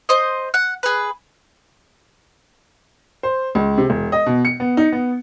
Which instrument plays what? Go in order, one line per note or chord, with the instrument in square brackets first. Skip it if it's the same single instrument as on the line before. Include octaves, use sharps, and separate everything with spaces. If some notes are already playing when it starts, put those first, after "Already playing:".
[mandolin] C5 D#5
F#5
G#4 B4
[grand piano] C5
C#2
C3
E1
D#5
B2
C#7
B3
D#4
B3